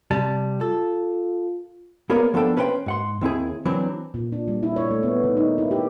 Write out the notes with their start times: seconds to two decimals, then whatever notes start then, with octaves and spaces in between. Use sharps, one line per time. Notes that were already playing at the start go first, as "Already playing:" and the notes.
0.11 C3 G3 A5
0.61 F4 A4
2.10 A#3 B3 G#4 A#4 C#5 D5
2.34 F3 B3 D4 A4 G5
2.57 C#4 B4 C5 F#5 G5
2.86 G#2 F#5 C6
3.21 D#2 C4 E4 G#4
3.65 E3 F#3 C4 D4
4.14 A#2
4.32 D4
4.48 G3
4.63 E4
4.76 C#5
4.91 A3
5.03 B3
5.23 D#3
5.37 D#4
5.58 E4
5.71 G4